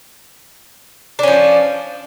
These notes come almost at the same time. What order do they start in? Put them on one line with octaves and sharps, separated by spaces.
D4 C#4 F3